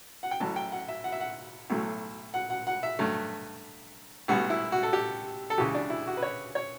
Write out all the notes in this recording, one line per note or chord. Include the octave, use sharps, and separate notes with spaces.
F#5
G5
A1 A2 F#3 A5
G5
F#5
E5
F#5
E5
F#5
B1 A2 F#3 A3
F#5
F#5
F#5
E5
G2 F#3 A3
B1 A2 G3 B3 F#4
E4
F#4
A4
G4
A4
C#2 C#3 E3 G4
D4
E4
F#4
B4
C#5
C#5